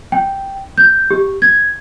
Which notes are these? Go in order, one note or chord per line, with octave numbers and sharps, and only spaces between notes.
G5
G6
G4
G#6